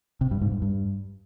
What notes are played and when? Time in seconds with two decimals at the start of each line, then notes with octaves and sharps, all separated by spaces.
0.21 C3
0.31 G2
0.41 G#2
0.52 G2
0.62 G2